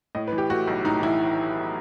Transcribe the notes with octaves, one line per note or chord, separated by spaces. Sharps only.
A2 D#5
B4
E3
G4
A3 F#4
B1
A2 D#4
E3 E4